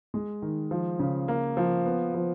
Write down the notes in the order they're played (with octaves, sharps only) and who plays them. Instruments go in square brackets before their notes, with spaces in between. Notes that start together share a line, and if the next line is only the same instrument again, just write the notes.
[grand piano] G#3
D#3
F3
C#3
A#3
F3
B3
F3